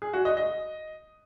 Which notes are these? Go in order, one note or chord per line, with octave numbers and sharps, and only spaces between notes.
G#4
F#4
D#5
D#5